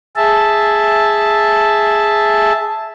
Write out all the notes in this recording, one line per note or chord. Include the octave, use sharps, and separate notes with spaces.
G#4 E5 A5